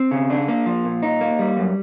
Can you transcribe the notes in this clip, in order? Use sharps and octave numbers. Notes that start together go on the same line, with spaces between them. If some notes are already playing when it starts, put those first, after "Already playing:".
Already playing: C4
C#3
D4
A#3
F3
A#2
D#4
A#3
G3
F#2